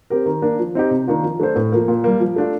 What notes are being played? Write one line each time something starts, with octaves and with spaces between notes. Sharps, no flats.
C4 G4 A#4
D#3
A#3 D4
F3
C4 D#4 G4
C3
D#3 A#3 D4 F4
F3
A3 D4 A4 C5
A2
F3 A#3
A#2
G3 A#3
F3
A3 D4 F4